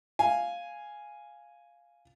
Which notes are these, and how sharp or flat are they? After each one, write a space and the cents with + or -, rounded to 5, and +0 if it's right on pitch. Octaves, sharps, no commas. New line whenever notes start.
F5 +0 G#5 +0